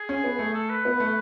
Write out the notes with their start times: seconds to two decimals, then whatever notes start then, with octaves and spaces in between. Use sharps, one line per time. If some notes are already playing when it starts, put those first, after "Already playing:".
Already playing: G#4
0.09 C#4
0.24 B3
0.39 A3
0.54 A4
0.70 B4
0.85 B3
1.00 A3